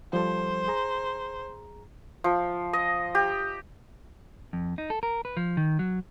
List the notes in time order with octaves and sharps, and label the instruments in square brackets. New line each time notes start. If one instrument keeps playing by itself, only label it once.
[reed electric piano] F3 G3 A4 [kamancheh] C5
[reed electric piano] G#4 A#5
[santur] F3
D#5
G4
[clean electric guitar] F2
D#4
A4
A#4
B4
F3
D#3
F#3